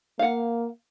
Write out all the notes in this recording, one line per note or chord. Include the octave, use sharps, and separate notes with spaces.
A#3 F5 F#5